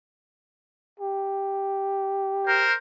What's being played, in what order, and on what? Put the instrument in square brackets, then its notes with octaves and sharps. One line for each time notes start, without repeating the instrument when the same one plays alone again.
[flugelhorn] G4
[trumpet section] A#4 C5